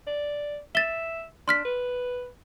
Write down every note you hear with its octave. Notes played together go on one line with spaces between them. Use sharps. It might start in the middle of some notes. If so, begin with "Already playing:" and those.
D5
E5 A6 G7
D4 C6 F6 B6
B4